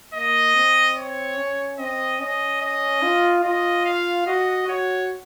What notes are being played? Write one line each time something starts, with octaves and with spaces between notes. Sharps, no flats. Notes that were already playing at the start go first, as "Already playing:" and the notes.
A#3 D#5
C4
C#5
C#4
C4 D#5
C#4 D#5
D#5
F4
F4 D#5
F5
F#4 D#5
F#4 C#5